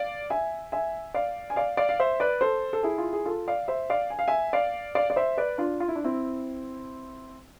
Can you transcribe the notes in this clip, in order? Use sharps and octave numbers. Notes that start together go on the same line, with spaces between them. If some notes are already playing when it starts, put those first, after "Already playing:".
Already playing: D5 F5
E5 G#5
E5 G#5
D5 F5
G#5
D5 F5
D5 F5
F5
C5 E5
B4 D5
A4 C5
A4
E4 G#4
F4
G#4
F4 A4
D5 F5
C5 E5
D5 F5
G#5
F5
E5 G#5
D5 F5
D5 F5
D5
C5 E5
B4 D5
D4 F4
F4
E4
D4
C4 E4